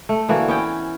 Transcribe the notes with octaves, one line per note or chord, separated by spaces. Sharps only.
A3
D3 E3 A#3 F#4
B3 C#4 G5